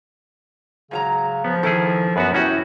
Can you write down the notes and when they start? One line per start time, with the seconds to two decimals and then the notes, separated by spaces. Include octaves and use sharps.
0.91 G#2 C#3 F#3 A#5
1.44 F3 B3
1.63 D#3 E3 E4 G#4 A4
2.16 F#2 B3 F#4 B4
2.34 B3 C#4 E4 F#4 G4